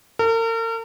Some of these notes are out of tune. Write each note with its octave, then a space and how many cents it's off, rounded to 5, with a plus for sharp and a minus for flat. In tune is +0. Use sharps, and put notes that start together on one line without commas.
A#4 -40